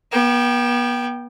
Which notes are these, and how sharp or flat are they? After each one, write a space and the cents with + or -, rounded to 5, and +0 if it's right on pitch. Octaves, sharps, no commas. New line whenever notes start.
B3 -40 G5 +0